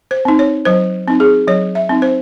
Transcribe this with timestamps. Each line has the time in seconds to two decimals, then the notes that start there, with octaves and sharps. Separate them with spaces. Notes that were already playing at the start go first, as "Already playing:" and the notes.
0.11 C5
0.25 C4 D#4
0.39 C#5
0.65 F#3 C5
1.08 C4 D#4
1.20 G#4
1.47 F#3 C#5
1.75 E5
1.89 C4 D#4
2.02 C5